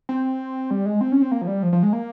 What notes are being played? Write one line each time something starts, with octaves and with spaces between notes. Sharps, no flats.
C4
G3
G#3
C4
C#4
C4
A#3
F3
G3
F3
F3
G#3
A#3